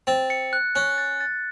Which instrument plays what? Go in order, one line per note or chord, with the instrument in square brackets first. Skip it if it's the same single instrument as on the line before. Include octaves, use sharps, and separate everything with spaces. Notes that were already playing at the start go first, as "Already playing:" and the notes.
[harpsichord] C4 [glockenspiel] A6
[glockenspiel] C#7
F#6
[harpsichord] C#4 [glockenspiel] F#6
[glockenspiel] A6
A6